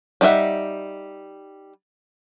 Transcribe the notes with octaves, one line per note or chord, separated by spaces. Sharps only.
G3 D#4 G#4 E5 F#5